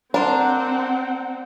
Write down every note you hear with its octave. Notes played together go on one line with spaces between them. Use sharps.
C4 D4 A#4 C5 F#5